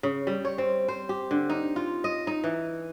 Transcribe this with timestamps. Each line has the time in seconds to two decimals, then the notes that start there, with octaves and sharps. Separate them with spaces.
0.03 C#3
0.27 G3
0.45 C#5
0.58 C4
0.88 C5
1.09 G4
1.31 D3
1.50 D#4
1.76 F4
2.04 D#5
2.27 D#4
2.44 E3